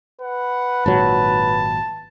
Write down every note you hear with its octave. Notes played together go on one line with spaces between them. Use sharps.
B4 F#5
G#1 A#2 F#3 A5